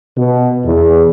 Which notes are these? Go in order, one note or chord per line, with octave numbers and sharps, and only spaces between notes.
B2
E2